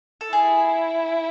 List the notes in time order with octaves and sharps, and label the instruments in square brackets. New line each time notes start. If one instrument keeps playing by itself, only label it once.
[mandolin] A4
[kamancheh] E4 [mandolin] G#4